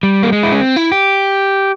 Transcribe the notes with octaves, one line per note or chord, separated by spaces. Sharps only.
G3
A#3
G#3
E4
C#4
C4
E4
G4